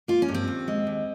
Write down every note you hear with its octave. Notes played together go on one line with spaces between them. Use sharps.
A#3 F4
C#4
G2
C4
D#2
G#3
D#2